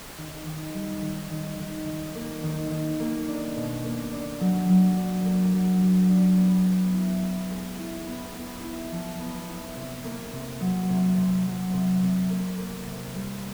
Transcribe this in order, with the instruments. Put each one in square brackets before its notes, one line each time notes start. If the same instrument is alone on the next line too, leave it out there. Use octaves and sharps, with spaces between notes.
[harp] D#3
D#3
G3
D#3
D#3
D#3
D#3
A#3
D#3
D#3
A#3
D4
B2
A#3
D4
F#3
F#3
D4
A#3
F#3
F#3
D4
B3
B3
E4
B3
G#3
E4
B3
B3
E4
F3
B3
E4
C3
A#3
C3
F#3
C3
C3
F#3
C3
C3
A#3
A#3
C3
G3